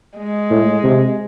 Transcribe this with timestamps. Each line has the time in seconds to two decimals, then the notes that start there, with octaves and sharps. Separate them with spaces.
0.18 G#3
0.51 A2
0.84 C3